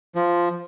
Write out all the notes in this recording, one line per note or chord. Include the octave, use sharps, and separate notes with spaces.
F3